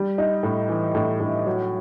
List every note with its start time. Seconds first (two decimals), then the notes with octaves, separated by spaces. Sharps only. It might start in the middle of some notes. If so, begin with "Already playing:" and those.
Already playing: G3
0.18 D#4
0.43 A2
0.69 E3
0.95 A2
1.20 A2
1.46 F#3